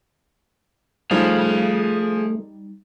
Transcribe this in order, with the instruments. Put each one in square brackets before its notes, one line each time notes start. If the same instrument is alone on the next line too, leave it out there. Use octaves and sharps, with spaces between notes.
[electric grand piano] F3 [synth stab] G3 D#4 [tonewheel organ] A3 [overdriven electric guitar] G#4 F5